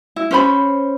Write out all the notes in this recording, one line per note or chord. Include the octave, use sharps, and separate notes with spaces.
E4
C#4 C5 B5